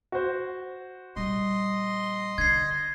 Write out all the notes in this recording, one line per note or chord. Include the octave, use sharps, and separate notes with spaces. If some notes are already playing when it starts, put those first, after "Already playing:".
F#4 C5
A#1 G3 D#5 C6
D3 G#6 C7